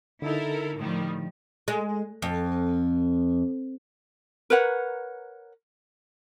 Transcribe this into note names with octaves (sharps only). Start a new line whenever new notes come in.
D3 D#4 E4 A4 A#4
A2 D#3 F3 G3
G#3
F2
A#4 B4 C#5 F#5